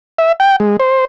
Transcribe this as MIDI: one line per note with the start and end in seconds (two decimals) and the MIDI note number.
0.18 0.32 76
0.40 0.56 79
0.60 0.77 56
0.80 1.05 72